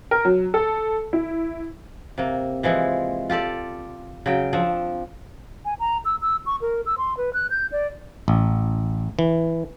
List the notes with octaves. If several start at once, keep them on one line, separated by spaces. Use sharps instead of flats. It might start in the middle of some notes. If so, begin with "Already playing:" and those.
A#4
F#3
A4
E4
C3 A#3
E3 F3 G#3 E4
F4 G4 A4 D5
C#3 F#3 G5
F3 C4 D4
G#5
A#5
E6
E6
C#6
A#4
E6
C6
B4
F#6
G6
D5
A1
E3